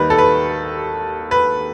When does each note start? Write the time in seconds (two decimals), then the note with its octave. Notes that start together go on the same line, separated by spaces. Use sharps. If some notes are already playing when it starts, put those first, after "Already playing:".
Already playing: D#2 D#3 G3 B4
0.10 A4
0.18 B4
1.31 B4